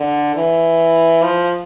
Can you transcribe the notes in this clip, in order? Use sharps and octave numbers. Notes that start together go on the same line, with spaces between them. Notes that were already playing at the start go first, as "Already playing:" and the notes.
Already playing: D3
E3
F3